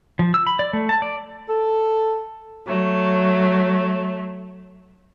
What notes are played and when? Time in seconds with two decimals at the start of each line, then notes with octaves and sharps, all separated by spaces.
0.19 F3
0.34 E6
0.47 B5
0.59 D5
0.73 A3
0.89 A5
1.02 D5
1.49 A4
2.66 F#3 A3